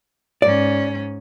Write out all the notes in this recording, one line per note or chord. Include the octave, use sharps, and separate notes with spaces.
G#2 C#4 D5